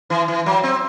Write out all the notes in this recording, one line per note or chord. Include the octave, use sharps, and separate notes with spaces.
E3
E3
F#3
C4